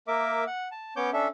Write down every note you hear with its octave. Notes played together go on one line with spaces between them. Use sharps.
A#3 A#4 E5 D6
F#5
A5
B3 C#4 C#5 D6 G6
C#4 D4 A4 E5